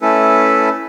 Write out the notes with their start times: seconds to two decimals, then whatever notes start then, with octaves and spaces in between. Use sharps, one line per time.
0.01 A3 C#4 E4 A4 B4